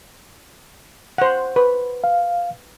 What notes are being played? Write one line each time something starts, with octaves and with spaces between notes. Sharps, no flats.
C5 F#5
B4
F5